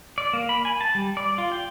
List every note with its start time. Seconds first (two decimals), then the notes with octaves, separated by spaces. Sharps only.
0.18 D5
0.33 A#3
0.49 B5
0.65 G#5
0.81 A5
0.95 G3
1.17 D5
1.38 F4
1.52 G5